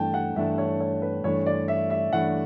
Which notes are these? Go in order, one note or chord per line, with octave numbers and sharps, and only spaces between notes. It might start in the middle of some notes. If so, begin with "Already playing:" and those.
Already playing: G2 E3 A3 D4 G5 A5
F#5
G2 E3 A3 D4 E5
C#5
C#5
B4
G2 E3 A3 D4 C#5
D5
E5
E5
G2 E3 A3 D4 F#5